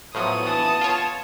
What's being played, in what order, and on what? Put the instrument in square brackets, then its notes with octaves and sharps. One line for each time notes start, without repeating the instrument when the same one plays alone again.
[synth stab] A2 F3 F#3 [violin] B3 D#6
[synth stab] E3 [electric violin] A5
[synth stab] F4 C#5